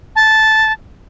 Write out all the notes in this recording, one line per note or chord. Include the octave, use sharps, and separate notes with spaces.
A5